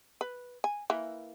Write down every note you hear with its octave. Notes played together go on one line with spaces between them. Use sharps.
B4
G#5
E3 A#3